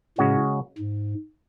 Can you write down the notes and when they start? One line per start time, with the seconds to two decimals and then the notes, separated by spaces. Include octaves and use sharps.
0.18 A2 C#3 G#3 C#4 F#4 C#5
0.78 G#2